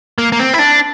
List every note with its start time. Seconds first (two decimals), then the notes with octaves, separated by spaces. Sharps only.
0.18 A#3
0.32 A#3
0.39 C4
0.54 E4
0.59 D4